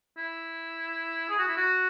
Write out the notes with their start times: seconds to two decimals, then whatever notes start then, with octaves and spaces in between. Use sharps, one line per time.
0.17 E4
1.29 G#4
1.39 F#4
1.48 E4
1.57 F#4